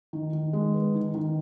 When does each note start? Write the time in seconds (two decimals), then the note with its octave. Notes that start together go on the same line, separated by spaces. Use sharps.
0.13 D#3
0.33 D#3
0.53 G#3
0.74 B3
0.94 D#3
1.15 D#3